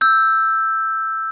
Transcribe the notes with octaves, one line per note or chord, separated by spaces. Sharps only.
E6 G6